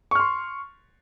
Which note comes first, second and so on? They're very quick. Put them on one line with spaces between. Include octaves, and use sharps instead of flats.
C#6 F6 C6